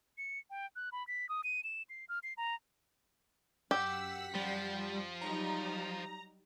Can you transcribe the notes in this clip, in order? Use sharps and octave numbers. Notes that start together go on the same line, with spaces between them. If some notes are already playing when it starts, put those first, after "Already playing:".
C#7
G5
F#6
B5
B6
D#6
D#7
E7
C7
F6
C7
A#5
F#2 G4 F#5 E6 B6
F3 G3
F#3 G3 D#4 A#5